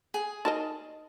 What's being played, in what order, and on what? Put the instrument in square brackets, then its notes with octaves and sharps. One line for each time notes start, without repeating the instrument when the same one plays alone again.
[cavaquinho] G#4
[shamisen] D#4 A#4 D#5 [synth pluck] A5